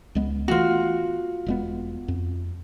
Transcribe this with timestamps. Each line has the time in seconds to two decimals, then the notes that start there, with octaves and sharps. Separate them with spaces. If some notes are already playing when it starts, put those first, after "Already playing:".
0.15 C#2 G#3 B3
0.48 E3 A3 B3 F4 F#4
1.46 E1 G#3 B3
2.08 F2